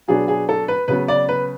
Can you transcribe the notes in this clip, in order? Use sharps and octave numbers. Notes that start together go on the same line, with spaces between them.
B2 F#3 B3 D4 G#4
G#4
A4
B4
C#3 F#3 B3 B4
D5
B4